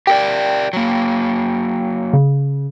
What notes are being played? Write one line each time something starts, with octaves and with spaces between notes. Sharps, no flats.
G4 A#4 D5 G5
F#3 A#3
C#3